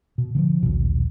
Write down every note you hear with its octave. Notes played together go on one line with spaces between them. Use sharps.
B2
D3 E3 F3
A#1 D#2 B2